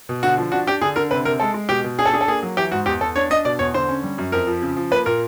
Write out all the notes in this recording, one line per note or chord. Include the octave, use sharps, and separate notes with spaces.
B2
D3 F#4
F3
D4 F#4
D4 G4
D3 G#4
D3 A#4
C3 B4
C3 A#4
G#3 A4
G#3
B2 G4
B2
D4 G#4
A4
D4 G#4
A4
A#3 G#4
F#3
E3 G4
G#2 F#4
E2 G4
E2 A4
D4 C#5
D4 D#5
B2 D5
E2 C#5
D3 C5
C#4
G3
F#2
F2 A#4
F3
C#3
F3
A#3 B4
A#2 A#4